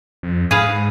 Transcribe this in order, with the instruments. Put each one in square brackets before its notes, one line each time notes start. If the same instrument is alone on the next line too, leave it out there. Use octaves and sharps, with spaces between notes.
[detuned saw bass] F2
[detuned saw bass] G#2 [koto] G#4 B4 F5